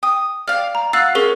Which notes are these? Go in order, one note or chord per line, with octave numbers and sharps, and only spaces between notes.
G5 D#6
D5 F5 F6
A#5
F4 F#4 E6 F#6 A6 C7
C#4 G#4 A#4 G7